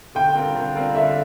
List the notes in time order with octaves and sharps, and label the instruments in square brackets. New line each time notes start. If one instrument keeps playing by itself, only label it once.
[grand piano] D3 [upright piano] G5
[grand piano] G3 C4 F4 A#4
D3
G3 C4 F4 A#4
[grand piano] D3 [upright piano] E5